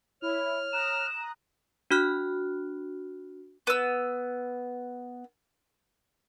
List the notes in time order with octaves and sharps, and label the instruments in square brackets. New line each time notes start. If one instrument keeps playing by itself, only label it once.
[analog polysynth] E4 [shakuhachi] C#5 [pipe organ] F6
[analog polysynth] A#5 D#6 F#6 [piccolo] E7
[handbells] D4 F#4 F6 F#6
[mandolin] B3 E6